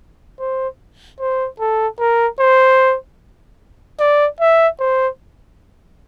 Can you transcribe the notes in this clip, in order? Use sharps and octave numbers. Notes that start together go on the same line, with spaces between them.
C5
C5
A4
A#4
C5
D5
E5
C5